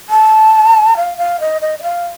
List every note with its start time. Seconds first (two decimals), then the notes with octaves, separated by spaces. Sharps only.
0.09 A5
0.97 F5
1.18 F5
1.40 D#5
1.62 D#5
1.79 D#5
1.83 F5